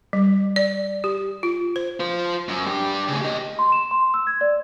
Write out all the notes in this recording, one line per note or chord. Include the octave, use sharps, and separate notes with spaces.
G3
D5
G4
F4
C5
F4 C5
F#2
D4 G4
A2 C#3
G4 D#5
C6
E7
C6
E6
G#6
D5